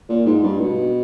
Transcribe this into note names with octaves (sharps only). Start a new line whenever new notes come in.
A#2
G#2
G2
B2